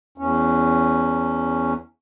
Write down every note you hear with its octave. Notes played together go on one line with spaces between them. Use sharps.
E2 C#4